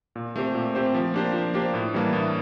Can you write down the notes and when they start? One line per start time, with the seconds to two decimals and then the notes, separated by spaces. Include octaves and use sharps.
0.16 A#2
0.36 A3 C4 G4 C5
0.55 A#2
0.75 A3 C4 G4 C5
0.95 F3
1.14 A#3 D4 G4 C5
1.33 F3
1.54 A#3 D4 G4 C5
1.74 A2
1.94 E3 G3 A#3 D4
2.13 A2